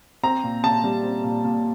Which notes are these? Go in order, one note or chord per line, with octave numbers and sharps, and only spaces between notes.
C4 A#5
A#2
A#2 A5
G3
C4
A#2
A#2